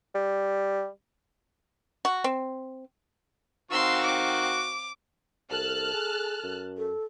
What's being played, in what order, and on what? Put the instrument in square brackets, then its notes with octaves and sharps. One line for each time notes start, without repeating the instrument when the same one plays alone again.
[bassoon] G3
[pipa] F#4
C4
[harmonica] D#3 F#4 C#6 [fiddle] C4 F5 [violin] C6 E6
[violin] D6
[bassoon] C2 [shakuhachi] A4 [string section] A5 F6 F#6
[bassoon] G#4
F#2
[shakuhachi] A4